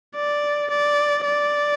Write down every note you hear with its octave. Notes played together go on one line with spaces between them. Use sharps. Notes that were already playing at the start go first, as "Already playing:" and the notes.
D5
D5
D5